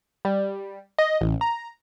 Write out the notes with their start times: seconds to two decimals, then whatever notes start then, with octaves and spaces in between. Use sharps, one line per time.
0.25 G3
0.99 D#5
1.21 A1
1.41 A#5